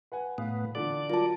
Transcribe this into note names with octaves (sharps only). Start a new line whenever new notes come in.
B4 F#5 G#5
A2 B3 B4 F5
A#2 D3 E3 D5
F#3 F4 A#4 A5